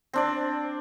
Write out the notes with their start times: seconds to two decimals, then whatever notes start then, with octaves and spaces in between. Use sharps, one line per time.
0.13 C4 D4 D5